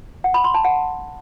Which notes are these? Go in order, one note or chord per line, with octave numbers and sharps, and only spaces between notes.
F#5
B5
C6
A5
F#5